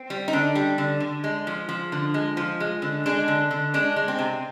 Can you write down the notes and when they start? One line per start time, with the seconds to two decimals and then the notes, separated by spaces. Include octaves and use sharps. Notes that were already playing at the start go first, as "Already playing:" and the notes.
Already playing: C4
0.10 G3
0.28 D#4
0.33 D3 D4
0.55 G3
0.78 D3
1.00 D3
1.24 G#3
1.47 F3
1.69 F3
1.92 D3
2.14 G#3
2.37 F3
2.60 G#3
2.82 D3
3.06 G#3 D4
3.28 D3
3.51 D3
3.74 G#3 D4
3.96 G#3
4.08 C4
4.19 C3